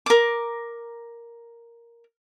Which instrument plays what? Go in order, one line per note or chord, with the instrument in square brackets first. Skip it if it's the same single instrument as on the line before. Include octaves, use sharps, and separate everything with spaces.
[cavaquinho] A#4 D6